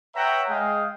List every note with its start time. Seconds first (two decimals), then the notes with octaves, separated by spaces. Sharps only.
0.15 B4 C#5 E5 F#5 G5 A#5
0.49 G#3 G#4 D#5 F5 G5 D#6